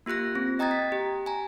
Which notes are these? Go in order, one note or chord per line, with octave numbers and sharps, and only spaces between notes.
A#3 F4 G4 F#6 A#6
C4
D#5 G5 A#5 D#6 G#6 A6
B6
G4
G#5 A#5